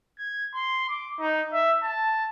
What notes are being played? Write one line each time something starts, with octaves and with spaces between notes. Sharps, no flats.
G#6
C6
D6
D#4
E5
A5